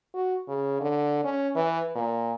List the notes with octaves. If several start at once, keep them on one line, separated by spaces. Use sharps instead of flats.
F#4
C#3
D3
C#4
E3
A#2